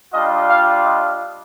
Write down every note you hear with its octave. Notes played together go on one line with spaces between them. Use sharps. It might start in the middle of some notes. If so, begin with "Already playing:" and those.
G3 D4 F4 D#5
F5
D#5